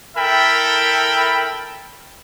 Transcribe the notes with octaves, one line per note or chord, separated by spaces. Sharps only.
E4 A4 A#4 E5 G5 B5